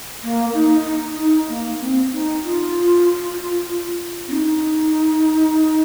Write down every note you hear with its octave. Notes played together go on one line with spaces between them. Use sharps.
A#3
D#4
D#4
D#4
A#3
C4
D#4
F4
C4
D#4